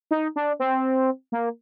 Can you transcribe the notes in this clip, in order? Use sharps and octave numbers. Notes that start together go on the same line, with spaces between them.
D#4
D4
C4
A#3